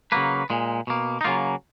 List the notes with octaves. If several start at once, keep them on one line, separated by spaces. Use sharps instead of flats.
C#3 F#3 A#3 B4
A#2 G#3
B2 A#3
D#4
C#3 F#3 A#3 F4